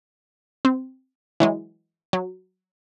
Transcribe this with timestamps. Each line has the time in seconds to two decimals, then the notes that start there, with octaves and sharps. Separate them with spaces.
0.65 C4
1.40 E3 F#3 G#3
2.13 F#3